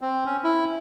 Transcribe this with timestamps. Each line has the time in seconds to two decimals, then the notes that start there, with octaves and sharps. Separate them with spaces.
0.01 C4
0.25 C#4
0.44 E4